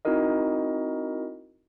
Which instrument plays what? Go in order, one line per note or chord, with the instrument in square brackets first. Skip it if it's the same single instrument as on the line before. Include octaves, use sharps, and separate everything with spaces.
[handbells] C4 D#4 E4 F#4 A#4 D#5